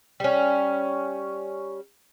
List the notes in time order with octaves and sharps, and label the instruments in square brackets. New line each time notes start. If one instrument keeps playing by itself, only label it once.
[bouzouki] G3 C#4